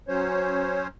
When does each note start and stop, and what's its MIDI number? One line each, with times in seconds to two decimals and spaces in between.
0.08 0.87 54
0.08 0.87 61
0.08 0.87 72
0.08 0.87 73